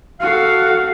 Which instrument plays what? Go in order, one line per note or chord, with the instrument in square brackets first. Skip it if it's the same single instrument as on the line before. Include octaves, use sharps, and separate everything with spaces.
[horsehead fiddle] F#4 A4 [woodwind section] F5